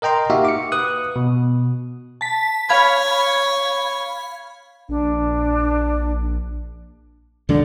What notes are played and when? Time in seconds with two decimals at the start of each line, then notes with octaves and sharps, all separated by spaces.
0.02 A#4 D#5 G5 A#5 C6
0.30 A#3 D#4 F#4 G4 E5 F5
0.45 D6 C#7
0.72 B4 D#6 F#6
1.16 B2
2.21 A5 B6
2.69 C#5 F5 B5 G#6
4.89 A#1 D4
7.49 C#2 A2 D3 F#3